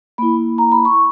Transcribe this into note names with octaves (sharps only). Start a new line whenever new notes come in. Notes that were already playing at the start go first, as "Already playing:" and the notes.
A#3 E4 B5
A#5
B5
C#6